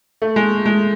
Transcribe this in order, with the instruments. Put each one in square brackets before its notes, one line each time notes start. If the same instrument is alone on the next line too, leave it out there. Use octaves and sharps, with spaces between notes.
[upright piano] A3
G#3
G#3